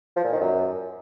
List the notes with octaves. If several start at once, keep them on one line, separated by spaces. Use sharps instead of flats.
F3
A#2
D#3
F#2